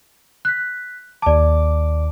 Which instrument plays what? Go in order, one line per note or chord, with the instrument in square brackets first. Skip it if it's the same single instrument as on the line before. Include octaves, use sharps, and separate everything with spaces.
[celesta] F#6 B6
[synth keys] D#2 D6 [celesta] D5 A5